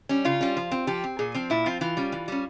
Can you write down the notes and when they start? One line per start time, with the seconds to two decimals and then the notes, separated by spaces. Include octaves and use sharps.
0.09 G3 C#4
0.25 C#3 F4
0.41 G3 C#4
0.57 F3
0.72 C4
0.87 F3 G4
1.04 C4
1.19 A#2 G#4
1.35 F3 C4
1.50 A#2 E4
1.66 F3 C4 F4
1.81 E3 F4
1.97 G3 C#4
2.12 E3
2.28 G3 C#4